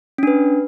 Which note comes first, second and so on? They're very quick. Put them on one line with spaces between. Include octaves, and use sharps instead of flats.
C#4 D4 B4